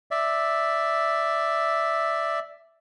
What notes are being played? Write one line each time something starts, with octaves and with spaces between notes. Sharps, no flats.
D5 E5